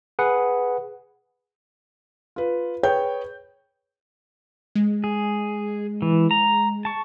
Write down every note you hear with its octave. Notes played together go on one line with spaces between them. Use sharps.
G#4 B4 F#5
F4 B4
G#4 B4 C#5 G5 G6
G#3
G#4
E3
A#5
A5 C#6